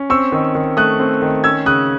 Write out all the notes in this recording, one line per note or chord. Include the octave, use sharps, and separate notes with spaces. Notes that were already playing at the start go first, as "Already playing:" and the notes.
Already playing: C#4
C4 C#6 E6
D#3
D#3
A3 D#6 F#6
C4
D#3
C#4 E6 G#6
C#3 D#6 F#6